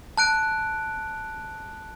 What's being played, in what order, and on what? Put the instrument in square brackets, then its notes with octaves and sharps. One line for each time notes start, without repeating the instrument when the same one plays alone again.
[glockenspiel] A5 F#6 D7